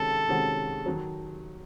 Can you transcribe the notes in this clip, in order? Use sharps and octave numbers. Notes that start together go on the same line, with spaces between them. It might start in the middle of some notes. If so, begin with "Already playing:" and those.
Already playing: C3 D#3 G#3 C#4 F#4 A4
C3 D#3 G#3 C#4 F#4
D#3 F#3